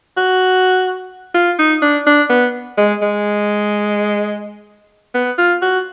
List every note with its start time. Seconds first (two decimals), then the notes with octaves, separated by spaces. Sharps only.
0.17 F#4
1.34 F4
1.59 D#4
1.82 D4
2.07 D4
2.30 B3
2.78 G#3
3.02 G#3
5.14 B3
5.38 F4
5.62 F#4